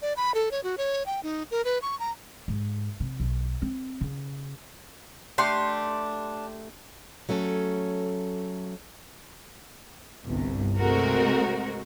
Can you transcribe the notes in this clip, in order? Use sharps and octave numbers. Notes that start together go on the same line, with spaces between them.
D5
B5
A4
C#5
F#4
C#5
G5
D#4
A#4
B4
C#6
A#5
G#2
C3
B1
C4
C#3
A3 D4 G4 C6
F#3 A3 C#4 A4
G1 C2
C3 G#3 A3 C4 F#4 A#4